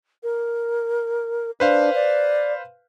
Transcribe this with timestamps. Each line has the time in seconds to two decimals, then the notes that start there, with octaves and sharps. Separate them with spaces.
0.23 A#4
1.60 D4 B4 C5 F5
1.95 D5